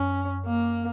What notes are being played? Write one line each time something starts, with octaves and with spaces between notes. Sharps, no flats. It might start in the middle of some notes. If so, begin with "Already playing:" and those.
Already playing: F#2 C#4
A#3